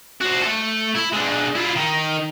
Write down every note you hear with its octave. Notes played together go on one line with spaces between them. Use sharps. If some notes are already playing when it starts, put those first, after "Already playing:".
F#4 C5
A3 A4
E4
G#3 D4
E4 F4
D#3 D#4